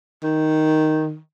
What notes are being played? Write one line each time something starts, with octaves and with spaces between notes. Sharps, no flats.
D#3